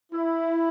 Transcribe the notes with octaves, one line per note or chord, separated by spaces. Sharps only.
E4